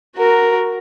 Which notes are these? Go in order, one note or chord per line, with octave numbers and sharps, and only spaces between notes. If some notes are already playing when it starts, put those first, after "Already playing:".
F#4 A#4